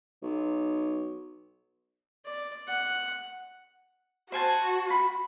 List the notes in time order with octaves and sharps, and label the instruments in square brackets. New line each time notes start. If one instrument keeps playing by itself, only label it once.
[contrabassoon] B1
[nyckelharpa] D5
F#5
[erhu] F#4 [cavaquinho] C5 G#5 A5
[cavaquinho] B5